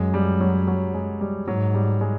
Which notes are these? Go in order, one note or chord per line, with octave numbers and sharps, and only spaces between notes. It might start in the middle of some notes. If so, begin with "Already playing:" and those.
Already playing: F#2 G#3
G3
F#3
F#3
G#3
G3
G#2 F#3
G3
G#3